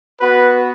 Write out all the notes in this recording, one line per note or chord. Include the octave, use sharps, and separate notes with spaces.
B3 F#4 B4